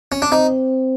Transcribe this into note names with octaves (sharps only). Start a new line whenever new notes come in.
C#4
D4
C4 D#4